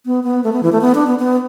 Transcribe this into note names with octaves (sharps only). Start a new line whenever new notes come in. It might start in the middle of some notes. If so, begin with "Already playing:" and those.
B3
B3
A3
B3
E3
A3
B3
D4
B3
B3